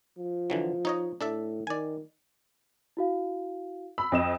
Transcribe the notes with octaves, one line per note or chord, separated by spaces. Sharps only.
F3
D3 E3 F#3
D#4 C#5 D#5
A2 D4 A4 E5
D#3 D5 G#5
E4 F#4 F5
B5 E6
F2 D#5 E7